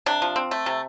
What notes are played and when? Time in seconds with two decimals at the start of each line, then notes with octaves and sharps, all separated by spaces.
0.06 C3 D4
0.22 F3
0.36 C4
0.51 A3
0.66 C3